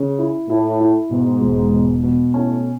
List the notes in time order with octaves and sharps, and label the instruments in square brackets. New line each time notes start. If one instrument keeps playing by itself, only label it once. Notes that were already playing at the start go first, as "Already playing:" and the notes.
Already playing: [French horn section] C#3
[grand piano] E4
[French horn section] A2 [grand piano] E4
[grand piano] E4
[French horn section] G#2 [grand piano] B2
[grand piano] E1
B2
B2
[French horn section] A2 [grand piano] C#4